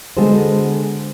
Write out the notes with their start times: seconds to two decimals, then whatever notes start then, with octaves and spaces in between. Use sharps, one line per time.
0.17 D3 G#3 B3 F#4 A4 C5